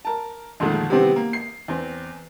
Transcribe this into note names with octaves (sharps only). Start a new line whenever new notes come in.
A#4 A5
F2 A#2 D3 D#3 G#3 A3
C3 D#3 E3 G3 B3 C4
A#3
C7
E2 C4